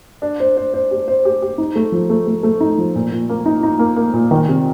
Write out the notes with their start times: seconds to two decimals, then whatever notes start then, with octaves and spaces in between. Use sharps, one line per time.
0.22 D4
0.40 C5
0.57 C5
0.74 C5
0.91 G4
1.08 C5
1.25 G4
1.42 G4
1.58 D#4
1.75 A3
1.92 F3
2.10 A3
2.27 A3
2.43 A3
2.60 D#4
2.78 F3
2.95 A#2
3.12 A#2
3.29 A#3
3.46 D#4
3.63 D#4
3.79 A#3
3.96 A#3
4.13 A#2
4.31 D#3
4.48 C3